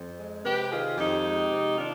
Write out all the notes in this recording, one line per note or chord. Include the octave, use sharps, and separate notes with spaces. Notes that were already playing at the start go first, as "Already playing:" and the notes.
Already playing: F2
G#3
C3 G4 B4
D#3 F4 G#4
F2 D#4 G4
G#3
C3
D#3 D4 F4